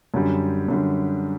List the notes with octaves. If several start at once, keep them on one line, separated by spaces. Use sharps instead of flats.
F#2 D3 G3
F#2 D3 G3